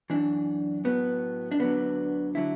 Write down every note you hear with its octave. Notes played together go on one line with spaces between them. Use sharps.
F#2 E3 D4
A2 F#3 B3
D4
D2 D3 F#3 B3
D3 F#3 E4